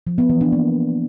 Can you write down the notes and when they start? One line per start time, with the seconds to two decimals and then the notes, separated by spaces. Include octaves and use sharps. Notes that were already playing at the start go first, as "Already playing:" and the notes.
0.07 F3
0.18 B3
0.30 E3
0.41 D4
0.52 A#3